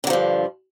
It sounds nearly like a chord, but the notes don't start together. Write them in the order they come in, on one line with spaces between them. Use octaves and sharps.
D3 F#3 F3 G2